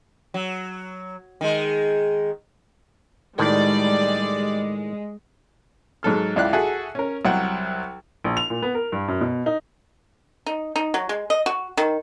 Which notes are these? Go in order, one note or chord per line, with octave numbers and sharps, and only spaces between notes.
F#3
D#3 G#3
A2 D#3 G3 G#3 D5
G#2 F#3 A4 F6
C#2 E4 D5 F5 G5 F#6
F#4 G#4 A4 E5 F#5
C#4 A#4
C2 F#3 F#5 G5
A#1
F7
A#2
B3
A#4
G2
F#2
B2
D#4
D#4
D#4
F#3
G#3
D#5
F#4
D#3